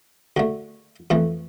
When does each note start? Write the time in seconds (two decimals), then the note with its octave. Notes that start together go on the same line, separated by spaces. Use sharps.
0.36 D2 D3 A3
1.10 F2 E3 A3